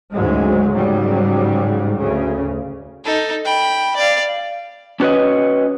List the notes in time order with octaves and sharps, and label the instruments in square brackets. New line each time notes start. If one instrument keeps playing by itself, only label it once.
[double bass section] D2 G#2 C#3 F#3 G#3
G#2 C#3 F#3 G3
D2 C#3
[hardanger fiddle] D#4 A4
G5 B5
D5 F5
[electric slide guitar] C#4 D4 F#4 B4 C#5 D#5